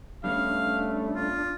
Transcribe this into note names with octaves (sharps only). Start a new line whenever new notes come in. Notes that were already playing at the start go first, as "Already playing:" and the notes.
G3 A3 B3 C#4 D4 F5
F4